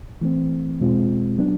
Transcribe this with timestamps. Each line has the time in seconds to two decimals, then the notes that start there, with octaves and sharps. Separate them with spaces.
0.21 E3 A3 C4
0.80 E2 B2 G#3 C4 F4
1.38 F#3 B3 D4